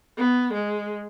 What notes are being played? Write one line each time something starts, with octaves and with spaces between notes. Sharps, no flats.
B3
G#3